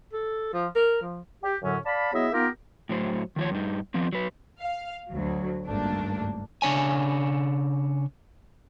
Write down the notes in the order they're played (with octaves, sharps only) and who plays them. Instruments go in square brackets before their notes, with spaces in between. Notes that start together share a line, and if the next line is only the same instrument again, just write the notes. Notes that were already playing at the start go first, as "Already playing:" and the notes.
[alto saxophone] A4
F3
A#4
F3
[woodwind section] G4
F#2 A2 D3 F#3 C#4
D5 F5 A5 B5
F#3 B3 E4 G#4 D#5 E5
A#3 B3 D#4 F4 G4 A#4
[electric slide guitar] A2 F#3 C5
D#3 F3 C#5
G2 D#4
F3 B3 C4
F#3 B4
[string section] F5
D2 F#3
G#1 C#2 G2 A3 A#3 D4
[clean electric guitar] C#3 D4 C#5 G#5